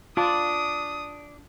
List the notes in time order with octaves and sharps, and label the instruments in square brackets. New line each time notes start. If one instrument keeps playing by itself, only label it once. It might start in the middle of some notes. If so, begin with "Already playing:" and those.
[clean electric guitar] D4 [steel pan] F4 A5 D6 [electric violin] D#6